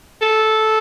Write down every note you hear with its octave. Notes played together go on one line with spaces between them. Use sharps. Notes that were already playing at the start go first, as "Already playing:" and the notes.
A4